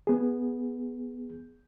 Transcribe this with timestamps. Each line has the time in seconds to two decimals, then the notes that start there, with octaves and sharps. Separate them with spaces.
0.07 B3 G#4